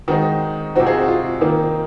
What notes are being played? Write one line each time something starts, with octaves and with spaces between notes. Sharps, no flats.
D#3 G#3 C4 D#4 F#4
C3 F3 C4 D#4 F#4
F4 G#4
F#4
F4
D#3 A#3 D#4